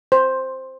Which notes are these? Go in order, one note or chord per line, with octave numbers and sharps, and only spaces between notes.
C5